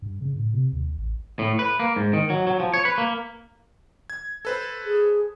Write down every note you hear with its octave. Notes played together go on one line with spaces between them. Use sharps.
G2
C#3
A2
C3
D#2
A1
A2
B4
A#3
G#2
D#3
F#3
F#3
F3
C#5
B4
A#3
G#6
A4 B4 C5
G#4